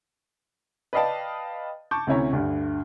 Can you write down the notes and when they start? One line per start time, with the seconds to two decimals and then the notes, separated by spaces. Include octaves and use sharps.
0.93 B4 D5 D#5 F5 G5 A5
1.91 A5 C#6 D6 G6
2.07 D2 C3 C#4 E4 C#5 A#5
2.33 D2 G2 D3